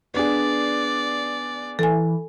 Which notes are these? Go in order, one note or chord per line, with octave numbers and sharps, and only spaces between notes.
B3 D4 G#4 D5
E3 A4 G#5